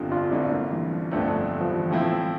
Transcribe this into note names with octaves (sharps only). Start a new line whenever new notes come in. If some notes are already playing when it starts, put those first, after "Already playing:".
Already playing: G1 F2 C3 G3 D4 F4
D4 F4
A1 G2 D3 C4 E4
A#3 D4
E3 G3
F3
G1 F2 D3 F3 A3
G3
F3
E3 G3
A2 F3 C4 E4